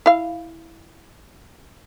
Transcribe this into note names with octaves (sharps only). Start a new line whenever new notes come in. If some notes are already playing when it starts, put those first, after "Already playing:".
E4 F5